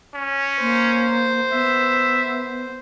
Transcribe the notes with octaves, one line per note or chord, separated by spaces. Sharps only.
C#4
A#3 C5
B3 E5